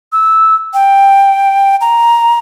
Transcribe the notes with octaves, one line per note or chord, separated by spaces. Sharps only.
E6
G5
A#5